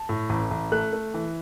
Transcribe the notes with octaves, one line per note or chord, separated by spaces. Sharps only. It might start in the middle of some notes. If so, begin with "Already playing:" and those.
Already playing: A5
A2
A1
A1
A3 F#6
A3
E3